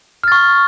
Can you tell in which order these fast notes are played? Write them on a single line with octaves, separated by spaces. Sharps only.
F6 A6 C#6